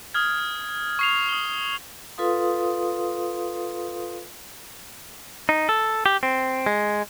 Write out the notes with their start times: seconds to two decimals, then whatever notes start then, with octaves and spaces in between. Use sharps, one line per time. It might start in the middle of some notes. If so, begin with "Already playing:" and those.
0.14 D#6 F6 G#6
0.99 C#6 C7 F7
1.29 D#6 G7
2.18 F4 A4 B4 F5 C6 D#6
5.49 D#4
5.69 A4
6.06 G4
6.23 C4
6.66 G#3